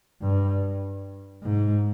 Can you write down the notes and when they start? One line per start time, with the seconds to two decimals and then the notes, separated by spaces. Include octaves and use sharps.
0.21 G2
1.43 G#2